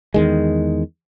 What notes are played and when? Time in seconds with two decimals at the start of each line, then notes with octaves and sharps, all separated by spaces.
0.14 E2 D#3 G#3